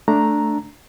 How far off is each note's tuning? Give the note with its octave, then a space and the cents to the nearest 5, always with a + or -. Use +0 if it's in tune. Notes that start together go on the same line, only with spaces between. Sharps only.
A3 +0 D4 +0 A#5 +0